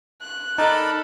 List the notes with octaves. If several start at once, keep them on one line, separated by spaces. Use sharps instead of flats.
F#6
D#4 A4 A#4 D5 A5 B5